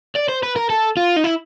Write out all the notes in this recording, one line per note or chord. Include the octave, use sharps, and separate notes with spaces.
D5
C5
B4
A#4
A4
F4
D#4
E4